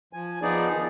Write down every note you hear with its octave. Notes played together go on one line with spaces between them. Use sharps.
F3 G#5
F3 B3 D#4 G#4 D5
D#3